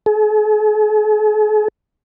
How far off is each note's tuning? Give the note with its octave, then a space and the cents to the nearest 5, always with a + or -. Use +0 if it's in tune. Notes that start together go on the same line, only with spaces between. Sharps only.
G#4 +45